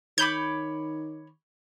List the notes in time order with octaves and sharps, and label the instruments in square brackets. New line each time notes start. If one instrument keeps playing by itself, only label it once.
[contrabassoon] D#3 [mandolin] C#5 B5 D6 [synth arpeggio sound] G6